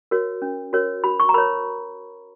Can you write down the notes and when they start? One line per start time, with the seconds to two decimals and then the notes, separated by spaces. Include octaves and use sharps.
0.11 F#4 A#4 C#5
0.42 C#4
0.73 F#4 A#4 C#5
1.04 F#4 B5
1.20 C#6
1.29 A#5
1.34 A#4 B5
1.38 C#5